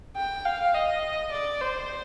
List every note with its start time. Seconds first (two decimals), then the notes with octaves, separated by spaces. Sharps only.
0.17 G5
0.45 F5
0.74 D#5
1.32 D5
1.61 C5